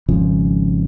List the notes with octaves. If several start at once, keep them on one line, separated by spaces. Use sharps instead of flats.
G#1 C#3 F3